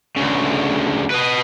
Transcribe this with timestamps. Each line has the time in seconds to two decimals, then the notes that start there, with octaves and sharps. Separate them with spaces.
0.17 D2 C#3
1.10 B4 D#5